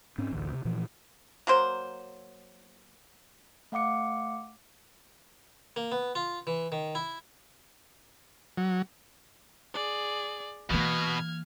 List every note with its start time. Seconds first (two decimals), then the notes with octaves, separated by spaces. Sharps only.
0.18 G#2 C4 C#4
0.31 A1 D2
0.52 C3
0.65 A#2 E3 F3
1.47 F#3 A#3 C5
3.72 A3 F5 F#5 D6 C#7
5.76 A#3
5.92 B3
6.15 F4
6.47 E3
6.72 D#3
6.95 E4
8.58 F#3
9.74 G#4 D5
10.70 B2 E3 A#3 F6 G#6